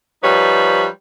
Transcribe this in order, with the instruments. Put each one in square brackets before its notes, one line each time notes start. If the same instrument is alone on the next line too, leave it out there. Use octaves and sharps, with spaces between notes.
[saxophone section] F3 G3 D#4 B4 C#5